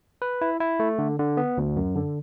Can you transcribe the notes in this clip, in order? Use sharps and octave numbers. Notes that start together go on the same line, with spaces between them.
B4
E4
E4
A3
D3
D3
B3
D2
F#2
D3